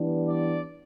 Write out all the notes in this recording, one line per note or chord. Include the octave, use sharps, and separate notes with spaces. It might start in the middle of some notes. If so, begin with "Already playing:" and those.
Already playing: E3 G3 B3 D4
D5